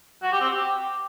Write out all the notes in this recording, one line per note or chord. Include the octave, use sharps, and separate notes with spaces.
F#4
G4
C4
G4